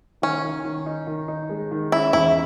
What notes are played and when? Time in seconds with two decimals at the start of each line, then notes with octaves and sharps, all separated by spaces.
0.22 D#3 C#4
0.44 D#3
0.65 D#3
0.86 D#4
1.07 D#3
1.28 D#4
1.49 G#3
1.71 D#3
1.92 C#4 E4
2.13 E2 E4